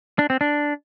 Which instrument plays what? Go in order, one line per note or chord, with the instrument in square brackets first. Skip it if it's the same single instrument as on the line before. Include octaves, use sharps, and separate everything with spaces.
[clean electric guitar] D4
C4
D4